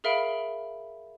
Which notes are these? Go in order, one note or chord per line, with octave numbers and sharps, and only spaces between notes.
G#4 A#4 E5 F5 B5 D7